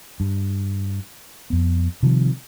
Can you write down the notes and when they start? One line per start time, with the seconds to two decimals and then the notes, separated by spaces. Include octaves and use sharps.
0.20 G2
1.50 F2 B3
2.03 C3 D#3 F3 G3